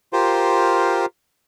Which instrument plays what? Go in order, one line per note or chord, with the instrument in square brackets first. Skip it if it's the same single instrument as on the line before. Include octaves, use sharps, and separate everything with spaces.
[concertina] F4 G4 A#4 C5